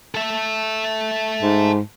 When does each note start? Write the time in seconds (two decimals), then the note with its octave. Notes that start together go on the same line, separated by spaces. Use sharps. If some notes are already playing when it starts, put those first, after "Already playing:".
0.15 A4 E5
1.42 G#2